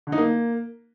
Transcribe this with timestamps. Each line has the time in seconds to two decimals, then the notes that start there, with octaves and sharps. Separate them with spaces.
0.07 D3
0.12 D#4
0.18 A#3